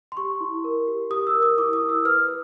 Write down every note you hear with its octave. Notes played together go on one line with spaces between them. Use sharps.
C6
G4 C#6
E4
A#4
G4
G4 D#6
E6
A#4
D#6
E4 D6
D#6
E4
E6
B4 F6
B4